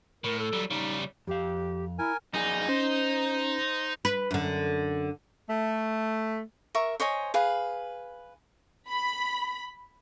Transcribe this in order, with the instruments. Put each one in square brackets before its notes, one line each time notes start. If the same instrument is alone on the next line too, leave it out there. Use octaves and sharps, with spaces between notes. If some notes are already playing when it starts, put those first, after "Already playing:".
[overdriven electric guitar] A2 [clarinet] A#4
[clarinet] A4
[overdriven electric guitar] F#3 G3
[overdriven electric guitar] C#3 G3 [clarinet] D#4
[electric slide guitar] F2 F5 [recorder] G4
[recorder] E4 [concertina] A#4 G#5
[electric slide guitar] F#2 G#4 D5 [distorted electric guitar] D#4
[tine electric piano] C#4 [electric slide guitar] C5
[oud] B4
F#2 D3
[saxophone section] A3
[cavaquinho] A#4 E5 C#6
C5 C#5 D#5 G#5
G#4 B4 F5
[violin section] B5